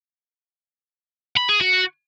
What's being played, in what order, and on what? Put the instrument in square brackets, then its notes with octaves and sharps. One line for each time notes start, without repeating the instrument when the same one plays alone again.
[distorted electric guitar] B5
G#4
F#4